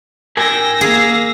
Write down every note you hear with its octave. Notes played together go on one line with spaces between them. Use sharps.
A#4 G5 G#5 E6 A#6
A#3 G#4 F5